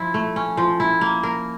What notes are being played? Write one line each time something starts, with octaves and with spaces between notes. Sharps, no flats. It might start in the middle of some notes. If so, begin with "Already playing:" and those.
Already playing: F3 E4
A3
C#4
F3
E4
A#3
A#4